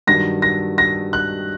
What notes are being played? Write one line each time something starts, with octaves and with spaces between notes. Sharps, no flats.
G2 D#3 F#3 A#6
A#6
A#6
F#6